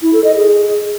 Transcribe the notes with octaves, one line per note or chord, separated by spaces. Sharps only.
E4
A4
D#5
G#4